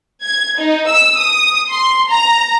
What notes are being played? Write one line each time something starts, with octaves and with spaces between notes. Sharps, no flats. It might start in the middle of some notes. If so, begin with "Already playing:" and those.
G#6
D#4
E6
D#6
C6
A#5